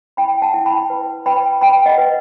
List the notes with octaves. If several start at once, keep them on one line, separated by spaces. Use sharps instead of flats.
E4 G5 B5
F#5 A5
E4
G5 B5
B4
B4 G5 B5
B4 G5 B5
D#5 F#5
B4